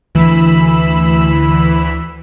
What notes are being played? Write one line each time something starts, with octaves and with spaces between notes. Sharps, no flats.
D2 E3 B5 E6